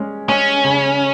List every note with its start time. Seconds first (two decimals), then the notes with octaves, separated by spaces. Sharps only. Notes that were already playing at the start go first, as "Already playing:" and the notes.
Already playing: G#3 C#4
0.29 G#3 C#4
0.64 C#3